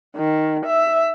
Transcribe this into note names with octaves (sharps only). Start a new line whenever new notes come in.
D#3
E5